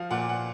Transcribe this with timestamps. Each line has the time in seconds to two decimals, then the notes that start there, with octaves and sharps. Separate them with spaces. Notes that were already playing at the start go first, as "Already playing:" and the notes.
Already playing: F3 F5
0.11 A#2 F#5
0.29 F#5